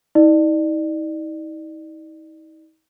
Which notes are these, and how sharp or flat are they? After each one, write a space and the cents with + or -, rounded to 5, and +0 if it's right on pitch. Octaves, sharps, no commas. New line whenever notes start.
D#4 +40 D5 +30